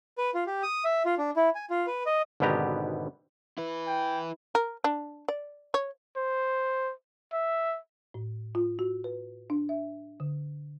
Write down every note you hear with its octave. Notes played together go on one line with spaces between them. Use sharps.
B4
F4
G4
D#6
E5
F4
D4
E4
G#5
F4
B4
D#5
G#1 B2 D3 B3 G4 A#5
E4 B4
G5
A#4
D4
D5
C#5
C5
E5
A2
F4
F#4
B4
D4
E5
D3